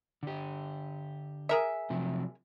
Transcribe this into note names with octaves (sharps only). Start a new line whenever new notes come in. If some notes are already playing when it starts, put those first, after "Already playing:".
D3 G4
G#4 A#4 E5
C3 F3 F#3